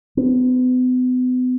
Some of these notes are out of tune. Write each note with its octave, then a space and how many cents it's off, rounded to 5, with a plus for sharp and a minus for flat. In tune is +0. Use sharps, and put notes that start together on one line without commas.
B3 +40